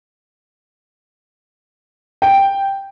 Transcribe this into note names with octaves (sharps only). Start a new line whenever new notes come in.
G5